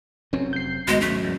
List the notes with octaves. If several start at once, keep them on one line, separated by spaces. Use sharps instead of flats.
F1 F#3 C4 C#4
G6 C7
G#1 D2 B2 G#3
F#2 A3
E2 G#2